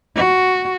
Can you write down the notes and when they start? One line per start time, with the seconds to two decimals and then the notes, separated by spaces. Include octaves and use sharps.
0.16 F#4